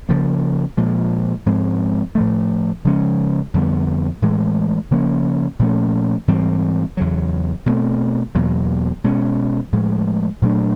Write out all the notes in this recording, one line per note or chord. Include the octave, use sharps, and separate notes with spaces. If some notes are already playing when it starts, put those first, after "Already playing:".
C#3 F3 A#3
A#2 F3 G#3
G#2 F3 G#3 C4
A2 F3 A3
C#3 F3 G#3 C#4
F2 D3 G3 B3
A2 E3 G#3
C#3 F3 A#3 C#4
A#2 F3 A3 C#4
G#2 E3 G3 C4
E2 C#3 F#3
B2 F#3 A3 C4
E2 B2 F#3 A#3
B2 G#3 C#4
A2 F3 G#3
A#2 F#3 A3 D4